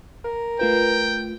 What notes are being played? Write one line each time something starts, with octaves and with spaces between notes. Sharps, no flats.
A#4
A3 F4 B4 G5